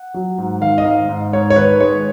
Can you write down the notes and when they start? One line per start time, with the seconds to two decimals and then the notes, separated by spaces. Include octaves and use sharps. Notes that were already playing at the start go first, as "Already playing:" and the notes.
Already playing: F#5
0.14 F#3
0.38 G#2
0.61 D#3 F5
0.78 D#5
0.85 G#2 F5
1.09 G#2
1.33 G#2 C#5
1.50 C#5
1.56 D#3 B4
1.80 G#3 C#5